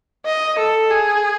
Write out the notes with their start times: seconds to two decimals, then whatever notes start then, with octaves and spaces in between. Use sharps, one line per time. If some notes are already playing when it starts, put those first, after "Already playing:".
0.26 D#5
0.58 A4
0.91 G#4